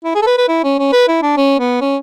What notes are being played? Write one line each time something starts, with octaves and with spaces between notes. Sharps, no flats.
E4
G#4
A4
B4
B4
E4
C#4
C#4
B4
E4
D4
C#4
B3
C#4